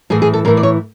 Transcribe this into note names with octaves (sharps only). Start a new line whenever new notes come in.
A2 E3 G#4
G#4
A4
A2 E3 A#4
D5
C#5